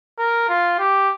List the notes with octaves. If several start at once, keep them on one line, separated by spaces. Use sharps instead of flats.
A#4
F4
G4